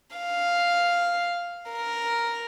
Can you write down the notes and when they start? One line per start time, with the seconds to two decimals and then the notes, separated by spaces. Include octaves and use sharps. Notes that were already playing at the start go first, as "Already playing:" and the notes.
0.17 F5
1.70 A#4